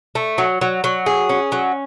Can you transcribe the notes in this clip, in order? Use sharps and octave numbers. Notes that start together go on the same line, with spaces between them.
A3
F#3
F#3
F#3
G#4
C#4
F#3